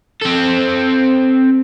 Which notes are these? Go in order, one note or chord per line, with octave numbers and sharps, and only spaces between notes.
C4 A4